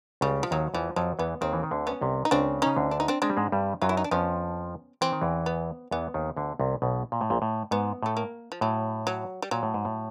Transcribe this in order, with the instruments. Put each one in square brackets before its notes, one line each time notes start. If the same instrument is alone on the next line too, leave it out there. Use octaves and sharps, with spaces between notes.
[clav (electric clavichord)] C#2 C#3 [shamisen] G3
[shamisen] F3
[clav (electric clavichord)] D#2 D#3 [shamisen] F#3
[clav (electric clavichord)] E2 E3 [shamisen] F3
[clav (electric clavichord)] F2 F3 [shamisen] F#3
[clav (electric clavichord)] E2 E3 [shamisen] B3
[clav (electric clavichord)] D#2 D#3 [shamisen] C4
[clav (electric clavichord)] E3
D#3
D2 D3
[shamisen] B3 C#4
[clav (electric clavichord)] C2 C3
[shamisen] D#4
[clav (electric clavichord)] C#2 C#3 [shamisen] C4 D4
[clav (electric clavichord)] C#3 [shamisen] C#4 D#4
[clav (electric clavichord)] D2 D3
[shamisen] D4
D#4
C4 D4
[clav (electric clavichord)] G#3 [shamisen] C4 D4
[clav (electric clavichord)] G3
G#2 G#3
G2 G3
[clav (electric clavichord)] F#2 F#3 [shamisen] F4
[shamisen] E4
D#4
D4
[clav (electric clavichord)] F2 F3 [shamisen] B3 C#4
[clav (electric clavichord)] E3 [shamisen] C4
[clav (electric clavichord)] D#3
E2 E3
[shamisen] B3
[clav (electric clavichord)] E2 E3 [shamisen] B3
[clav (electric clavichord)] D#2 D#3
D2 D3
C2 C3
B1 B2
A#2
A2
A#1 A#2
A2
[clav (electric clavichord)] G#2 [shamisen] B3
[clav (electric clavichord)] A2 [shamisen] A3
[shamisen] A#3
F3
[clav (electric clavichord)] A2 [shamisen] F#3
[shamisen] F#3
G3
[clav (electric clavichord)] A#2 [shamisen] F#3
[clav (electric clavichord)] A2
G#2
A2